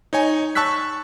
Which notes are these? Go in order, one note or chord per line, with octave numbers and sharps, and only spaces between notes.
D#4 C#5 G#5
A5 C#6 E6 F#6 B6